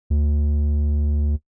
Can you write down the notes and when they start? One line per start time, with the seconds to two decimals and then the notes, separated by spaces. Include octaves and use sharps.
0.10 D2